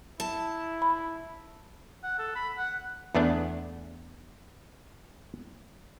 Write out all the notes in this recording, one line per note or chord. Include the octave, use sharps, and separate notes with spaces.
E4 A5
B5
F#5
A4
B5
F#5
E2 A3 B3 D4